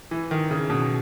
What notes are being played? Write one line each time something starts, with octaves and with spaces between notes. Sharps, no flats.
E3
D#3
C#3
B2